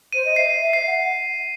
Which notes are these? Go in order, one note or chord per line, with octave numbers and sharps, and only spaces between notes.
C5 D#7
D#5
E5 C7
E5
C7
F#5